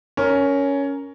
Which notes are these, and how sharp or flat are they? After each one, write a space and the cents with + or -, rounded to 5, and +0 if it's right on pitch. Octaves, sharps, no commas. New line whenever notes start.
C#4 +10 A#4 +0